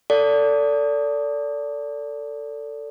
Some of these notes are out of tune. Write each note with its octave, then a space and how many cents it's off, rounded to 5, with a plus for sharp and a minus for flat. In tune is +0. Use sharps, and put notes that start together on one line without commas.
A4 +20 D5 -25